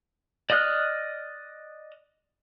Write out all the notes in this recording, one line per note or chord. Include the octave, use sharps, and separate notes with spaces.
D5 D#5 D#6 F6 F#6